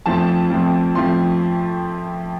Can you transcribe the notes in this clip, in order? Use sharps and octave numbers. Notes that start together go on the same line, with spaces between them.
F2 F3 A3 C4 A5
F2 F3 A3 C4
F2 F3 A3 C4 C6